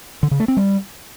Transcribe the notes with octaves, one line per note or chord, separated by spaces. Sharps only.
D3
C#3
A3
C4
G3